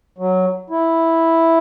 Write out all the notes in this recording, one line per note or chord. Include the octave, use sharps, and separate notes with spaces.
F#3
E4